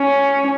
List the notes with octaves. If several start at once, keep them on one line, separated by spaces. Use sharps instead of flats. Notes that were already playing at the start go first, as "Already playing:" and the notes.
Already playing: C#4